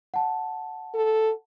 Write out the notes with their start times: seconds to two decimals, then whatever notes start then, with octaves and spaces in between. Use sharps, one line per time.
0.14 F#5 A5
0.94 A4